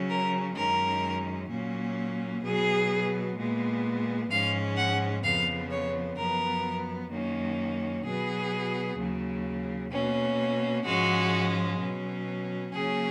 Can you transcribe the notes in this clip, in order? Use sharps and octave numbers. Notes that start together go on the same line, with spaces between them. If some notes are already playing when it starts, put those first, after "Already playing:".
Already playing: C#3 F#3 C#4
A#4
F#2 D#3 G#3 C#4 A#4
A#2 F#3 A#3 C#4
B2 F#3 B3 G#4
A#2 G#3 B3
G#2 F3 G#3 C#4 F5
F#5
F2 C#3 F3 B3 F5
C#5
F#2 F3 B3 A#4
F#2 D#3 A#3 C#4
B2 F#3 B3 G#4
D#2 C#3 F#3
B2 A#3 C#4
G#2 F3 G#3 C#4 F#4
B2 F#3 C#4
C#3 F#3 A#3 C#4 G#4